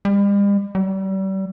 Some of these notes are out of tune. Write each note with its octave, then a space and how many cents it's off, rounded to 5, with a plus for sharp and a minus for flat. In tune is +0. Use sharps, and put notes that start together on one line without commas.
G3 +45
G3 -35